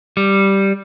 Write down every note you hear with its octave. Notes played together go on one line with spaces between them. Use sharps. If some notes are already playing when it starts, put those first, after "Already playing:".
G3